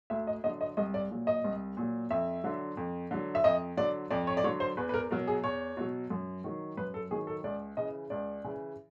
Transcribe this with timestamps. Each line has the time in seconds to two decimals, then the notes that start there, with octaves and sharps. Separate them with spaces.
0.10 D2 E5
0.27 D#5
0.44 D3 F#3 D#5
0.61 D#5
0.77 C2 D#5
0.94 D5
1.11 A#2 F#3
1.27 D#5
1.44 C2
1.77 A#2 F#3
2.10 F2 E5
2.44 D3 F#3
2.77 F2
3.11 D3 F#3
3.35 E5
3.44 F2 D#5
3.77 D3 F#3 D5
4.11 F2 D5
4.27 C#5
4.37 D5
4.44 D3 F#3 C#5
4.60 C5
4.77 E2 B4
4.89 B4
4.94 A#4
5.11 B2 F#3 A#4
5.27 G#4
5.43 E2 C#5
5.77 B2 F#3
6.10 F#2
6.44 D#3 F#3
6.77 F#2 B4
6.94 A4
7.11 D#3 F#3 G#4
7.27 A4
7.44 C#2 D5
7.77 C#3 E3 D#5
8.10 C#2 D5
8.44 C#3 E3